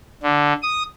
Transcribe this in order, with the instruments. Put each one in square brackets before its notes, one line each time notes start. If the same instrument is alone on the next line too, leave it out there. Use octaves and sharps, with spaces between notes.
[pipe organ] D3
D#6